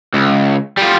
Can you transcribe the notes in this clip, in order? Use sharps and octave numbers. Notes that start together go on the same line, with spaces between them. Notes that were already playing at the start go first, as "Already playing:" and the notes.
C#2
G3 F4